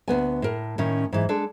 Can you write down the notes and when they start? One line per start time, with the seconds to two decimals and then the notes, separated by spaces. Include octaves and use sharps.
0.08 D2 B3 G#5
0.42 A2 A#4
0.78 A2 D#3 C#4
1.12 G#2 E3
1.29 G#3 D4 A4